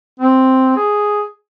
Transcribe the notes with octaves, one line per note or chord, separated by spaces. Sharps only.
C4
G#4